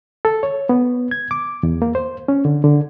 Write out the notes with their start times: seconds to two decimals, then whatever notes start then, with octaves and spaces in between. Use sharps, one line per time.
0.25 A4
0.43 C#5
0.69 B3
1.11 G#6
1.31 D6
1.63 E2
1.82 A#3
1.95 C5
2.28 C#4
2.45 D3
2.64 D3